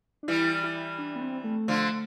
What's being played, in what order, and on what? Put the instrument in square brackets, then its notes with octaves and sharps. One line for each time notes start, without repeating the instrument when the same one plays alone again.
[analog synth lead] D4
[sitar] E3 G3 [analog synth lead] E4
[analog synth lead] E4
D4
B3
C4
A3
[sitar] D3 F3